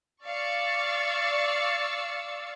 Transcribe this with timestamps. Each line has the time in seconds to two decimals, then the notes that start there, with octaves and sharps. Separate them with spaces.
0.25 D5 F5 C#6 E6 A6 C#7